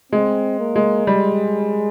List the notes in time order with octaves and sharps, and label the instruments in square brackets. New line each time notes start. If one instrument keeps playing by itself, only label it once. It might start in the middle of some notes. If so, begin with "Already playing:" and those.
[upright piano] G#3 [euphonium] C4
[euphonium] A#3
[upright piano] G#3
[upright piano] G3 [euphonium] G#3